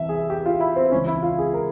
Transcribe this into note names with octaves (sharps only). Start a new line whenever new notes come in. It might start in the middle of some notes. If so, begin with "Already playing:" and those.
Already playing: C2 C3 E3 E5
G#4
G4
F4
E4
C4
C#2 C#3 E3 C#4
E4
F4
G#4
A#4